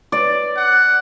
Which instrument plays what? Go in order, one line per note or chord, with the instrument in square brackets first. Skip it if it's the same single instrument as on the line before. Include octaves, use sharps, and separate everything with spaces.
[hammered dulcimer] D5
[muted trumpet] F#5